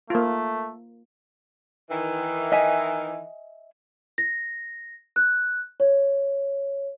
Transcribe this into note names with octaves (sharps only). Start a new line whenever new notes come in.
A3 A#3 F4
D#3 E3
D#5 E5 G#5
A#6
F#6
C#5